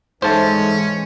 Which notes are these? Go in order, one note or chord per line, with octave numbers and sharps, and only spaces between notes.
G#2 E3 G#3 A3 C#4 C5 A5